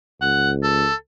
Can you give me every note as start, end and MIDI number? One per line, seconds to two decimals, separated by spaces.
0.22 0.88 37
0.22 0.51 78
0.63 0.95 69